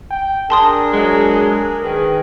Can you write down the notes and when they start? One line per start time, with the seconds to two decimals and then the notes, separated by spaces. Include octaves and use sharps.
0.11 G5
0.50 D4 G#4 A#4 A5 C6 D#6
0.93 F#3 G#3
1.83 D#3 G#4 B4